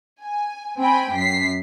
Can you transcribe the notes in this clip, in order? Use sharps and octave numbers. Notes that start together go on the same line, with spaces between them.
G#5
C4 G5 G#5 B5
F#2 B6 C7